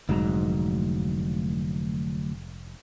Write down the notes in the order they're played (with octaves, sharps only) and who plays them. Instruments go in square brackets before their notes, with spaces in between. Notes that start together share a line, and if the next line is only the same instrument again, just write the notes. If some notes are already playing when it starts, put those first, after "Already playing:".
[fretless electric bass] F1 G#2 [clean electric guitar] D2 F#3 A#5